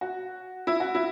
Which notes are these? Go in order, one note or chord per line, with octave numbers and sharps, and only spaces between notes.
F#4
E4
F#4
E4